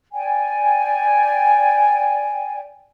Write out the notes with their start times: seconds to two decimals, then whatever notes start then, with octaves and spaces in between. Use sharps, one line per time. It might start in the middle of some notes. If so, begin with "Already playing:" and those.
0.12 D5 G5 G#5